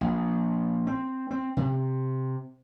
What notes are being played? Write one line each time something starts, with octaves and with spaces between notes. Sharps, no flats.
A#1
C4
C4
C3